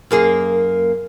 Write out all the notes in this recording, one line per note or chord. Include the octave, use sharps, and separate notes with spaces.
F#2 A#3 G#4